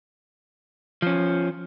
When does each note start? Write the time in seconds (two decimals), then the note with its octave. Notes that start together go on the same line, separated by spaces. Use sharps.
1.02 F3 C#4